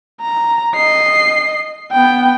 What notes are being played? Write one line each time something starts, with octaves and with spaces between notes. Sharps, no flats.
A#5
D#5 C7
B3 G5